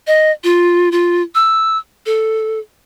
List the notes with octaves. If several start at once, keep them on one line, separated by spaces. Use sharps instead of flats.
D#5
F4
F4
E6
A4